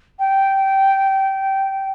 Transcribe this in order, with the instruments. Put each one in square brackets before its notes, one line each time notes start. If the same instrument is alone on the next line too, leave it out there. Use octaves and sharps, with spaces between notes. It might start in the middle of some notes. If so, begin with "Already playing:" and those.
[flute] G5